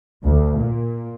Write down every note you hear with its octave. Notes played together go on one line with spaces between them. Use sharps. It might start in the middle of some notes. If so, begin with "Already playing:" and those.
D2
A#2